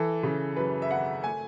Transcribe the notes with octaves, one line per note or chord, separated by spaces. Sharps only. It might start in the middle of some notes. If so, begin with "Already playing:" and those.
Already playing: E3 A4
C#3
F#2 B4
E5
G#1 F#5
A3 G#5